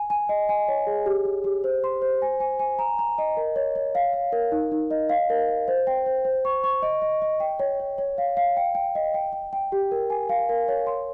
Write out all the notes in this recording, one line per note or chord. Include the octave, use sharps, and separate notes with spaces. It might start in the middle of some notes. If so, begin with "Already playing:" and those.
Already playing: G#5
G#5
D#5
G#5
C#5
G#4
G4
G4
G4
C5
C6
C5
G#5
G#5
G#5
A#5
A#5
D#5
A#4
C#5
C#5
F5
F5
A#4
D#4
D#4
D#5
F5
A#4
A#4
C5
G5
C5
C5
C#6
C#6
D#5
D#5
D#5
G5
C#5
C#5
C#5
F5
F5
G5
G5
D#5
G5
G5
G5
G4
A#4
G#5
F5
A#4
C#5
C6